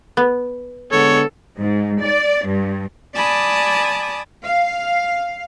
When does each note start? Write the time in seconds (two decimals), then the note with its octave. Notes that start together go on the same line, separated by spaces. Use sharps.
0.17 B3
0.92 D3 G#3 B3 A4 C#5
1.59 G#2
2.01 D5
2.46 G2
3.13 D5 G#5 A5 B5 D6 D#6
4.44 F5